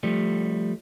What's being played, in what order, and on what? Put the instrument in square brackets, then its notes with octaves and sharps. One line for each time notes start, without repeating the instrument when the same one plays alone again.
[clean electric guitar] F3 G3 A3